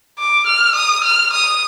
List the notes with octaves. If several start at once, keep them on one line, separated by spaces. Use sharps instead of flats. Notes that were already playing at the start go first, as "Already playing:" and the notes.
D6
F6
D#6
F6
D#6